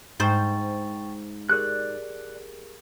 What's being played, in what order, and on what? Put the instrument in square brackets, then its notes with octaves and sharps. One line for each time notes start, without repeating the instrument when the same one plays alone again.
[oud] G#2 C5 [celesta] G5 C#6 A6
[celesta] G4 G#4 A#4 [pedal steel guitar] D5 F#6